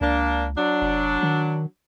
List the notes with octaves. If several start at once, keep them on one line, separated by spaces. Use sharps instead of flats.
C#2 A#3 D4
F#3 D4
F1
D#3